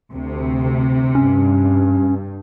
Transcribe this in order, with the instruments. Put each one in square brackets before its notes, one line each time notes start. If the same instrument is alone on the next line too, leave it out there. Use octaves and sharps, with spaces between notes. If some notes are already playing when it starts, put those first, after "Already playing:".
[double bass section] D2 [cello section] C3
[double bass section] G2 [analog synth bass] C#4